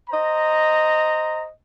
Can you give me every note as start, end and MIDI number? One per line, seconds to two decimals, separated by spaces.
0.10 1.49 72
0.10 1.49 75
0.10 1.49 82